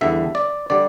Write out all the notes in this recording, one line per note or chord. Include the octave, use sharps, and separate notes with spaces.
E2 D3 G3 E5
D5
D3 G3 D5